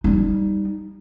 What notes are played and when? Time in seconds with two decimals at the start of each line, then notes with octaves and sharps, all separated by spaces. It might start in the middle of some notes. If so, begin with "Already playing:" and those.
0.04 G3 D#4